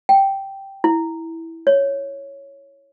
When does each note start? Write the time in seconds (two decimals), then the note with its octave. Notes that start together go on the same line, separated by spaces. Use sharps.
0.09 G5
0.84 E4
1.67 C#5